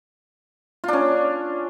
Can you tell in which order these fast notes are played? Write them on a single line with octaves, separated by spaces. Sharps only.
F4 D4 C#4